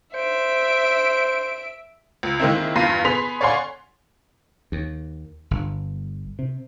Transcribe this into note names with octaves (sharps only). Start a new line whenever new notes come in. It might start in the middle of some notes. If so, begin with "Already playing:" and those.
C5 E5 D7
C#2
D#3 G#3 A#3 C4 E4
E2 G2 F4 C6 C7 D#7
B3 G#4 B5 C6 B6 F7
C#5 D5 F5 F#5 G#5 C6
D#2
G1
C3